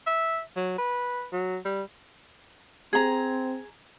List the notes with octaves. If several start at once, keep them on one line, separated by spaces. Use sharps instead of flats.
E5
F#3
B4
F#3
G3
C4 G#4 A#5